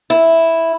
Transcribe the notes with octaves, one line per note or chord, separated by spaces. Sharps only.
E4